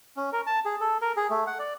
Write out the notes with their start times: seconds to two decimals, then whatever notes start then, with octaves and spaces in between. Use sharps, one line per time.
0.17 C#4
0.32 A#4
0.47 A5
0.65 G#4
0.81 A4
1.02 A#4
1.17 G#4
1.30 A3
1.47 F#5
1.59 D5